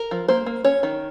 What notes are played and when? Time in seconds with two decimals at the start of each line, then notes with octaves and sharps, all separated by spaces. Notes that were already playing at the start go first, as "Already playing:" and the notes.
Already playing: A#4
0.11 F3
0.28 A#3 C5
0.46 A#3
0.64 C#4 C#5
0.83 D#3